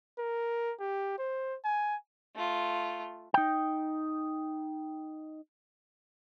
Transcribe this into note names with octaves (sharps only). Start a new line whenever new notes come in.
A#4
G4
C5
G#5
A3 F4
D#4 G5